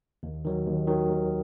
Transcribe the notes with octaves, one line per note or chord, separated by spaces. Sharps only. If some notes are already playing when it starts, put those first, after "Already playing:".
D#2
D#3 F#3
D#2
D#3 F#3
D#2